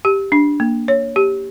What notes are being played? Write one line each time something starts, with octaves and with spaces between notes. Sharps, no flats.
G4
D4
A#3
C#5
G4